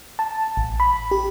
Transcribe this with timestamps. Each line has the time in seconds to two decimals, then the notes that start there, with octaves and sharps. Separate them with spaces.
0.19 A5
0.57 A1
0.80 B5
1.11 G4